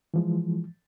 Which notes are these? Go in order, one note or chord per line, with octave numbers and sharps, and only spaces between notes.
E3 F3 G#3